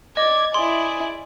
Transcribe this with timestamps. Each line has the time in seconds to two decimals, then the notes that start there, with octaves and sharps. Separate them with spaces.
0.17 D5 D#5 D6 G#6
0.54 E4 G#4 D5 G#5 C6